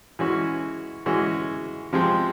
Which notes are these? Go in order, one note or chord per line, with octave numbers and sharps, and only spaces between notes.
E3 G#3 C#4 F#4
E3 G#3 C#4 F#4
C3 F3 G#3 C4